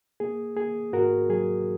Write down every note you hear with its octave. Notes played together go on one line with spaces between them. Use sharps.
A#3 G#4
A#3 G#4
G#2 F#4 A#4
F#3 G#4